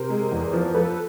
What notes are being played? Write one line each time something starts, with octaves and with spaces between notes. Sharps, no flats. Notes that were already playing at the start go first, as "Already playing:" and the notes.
Already playing: C3 A#4 C5
G#3
E2
F3
F3 A4 B4